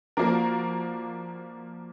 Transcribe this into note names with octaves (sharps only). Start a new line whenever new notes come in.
F3 A#3 D4 F#4 A#4